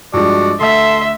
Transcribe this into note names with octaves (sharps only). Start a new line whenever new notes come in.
G2 F3 G#3 F#4 D5
D2 A4 E5 C6